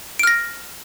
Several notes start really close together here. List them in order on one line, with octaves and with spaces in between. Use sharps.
D7 F6 A#6